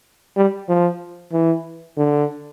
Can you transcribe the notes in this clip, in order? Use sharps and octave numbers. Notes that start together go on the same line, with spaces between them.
G3
F3
E3
D3